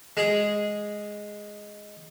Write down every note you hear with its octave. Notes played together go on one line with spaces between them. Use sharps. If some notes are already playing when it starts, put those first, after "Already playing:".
G#3 G#4